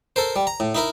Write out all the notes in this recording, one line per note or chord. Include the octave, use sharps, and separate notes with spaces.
A4 A#4 C5
G3
A#5
A2
D#4 E4 A#4